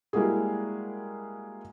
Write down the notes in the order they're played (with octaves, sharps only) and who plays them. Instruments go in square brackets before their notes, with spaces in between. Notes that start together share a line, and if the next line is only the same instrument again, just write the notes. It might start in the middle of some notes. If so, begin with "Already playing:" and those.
[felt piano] G3 G#3 A#3 E4 F#4 G#4